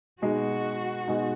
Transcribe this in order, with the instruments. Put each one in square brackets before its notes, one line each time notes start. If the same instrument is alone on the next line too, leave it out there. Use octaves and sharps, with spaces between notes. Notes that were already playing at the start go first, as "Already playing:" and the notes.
[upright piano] B2 G#3 D#4 [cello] F#4
[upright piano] B2 G#3 D#4